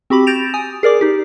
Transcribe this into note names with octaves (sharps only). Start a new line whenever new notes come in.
C4 F#4 G4 B5 D6
G6 A6 A#6 D7 E7 F7
G#5 D#6
G#4 A#4 D5 D6
D#4 G4